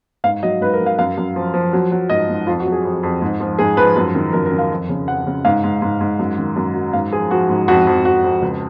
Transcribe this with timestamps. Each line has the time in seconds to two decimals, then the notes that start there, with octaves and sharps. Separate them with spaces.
0.24 G#2 F5
0.43 F#3 D#5
0.61 G#2 B4
0.74 A#4
0.80 F#3
0.86 F5
0.99 F#2 F5
1.17 F#2
1.36 F3
1.54 F3
1.73 F#3
1.92 F#3
2.10 G#2 D#5
2.29 G#2
2.47 F2 F4
2.60 F#4
2.66 F#3
2.72 G#4
2.85 F2
3.03 F2
3.22 G#2
3.40 F3
3.59 G#2 G#4
3.77 F3 B4
3.96 F#2
4.15 D#3
4.33 F#2 A#4
4.46 A#4
4.52 D#3
4.59 F5
4.71 F2
4.89 C#3
5.08 F2 F#5
5.27 C#3
5.45 G#2 F5
5.64 G#2
5.82 G#2
6.01 G#2
6.19 F#2
6.38 D#3
6.56 F#2
6.74 F#3
6.93 G#2 F5
7.12 F3 G#4
7.31 F3 F#4
7.49 G#2
7.68 F2 F#4
7.87 F2
8.05 F2 F#4
8.24 F2
8.42 C#2